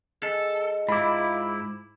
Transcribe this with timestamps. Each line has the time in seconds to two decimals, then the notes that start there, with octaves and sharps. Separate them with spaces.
0.23 G#3 G#4 A4
0.89 G#2 E4 F4 B5 D6